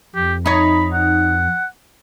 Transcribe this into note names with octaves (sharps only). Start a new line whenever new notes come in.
F2 G4
D#4 C#5 B5
F#5